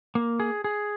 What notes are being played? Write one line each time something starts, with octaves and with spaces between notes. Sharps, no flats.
A#3
G#4
G#4